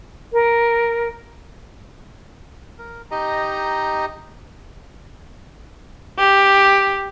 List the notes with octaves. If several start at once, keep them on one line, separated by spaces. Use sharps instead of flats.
A#4
A#4
D#4 G4 D#5 A#5
G4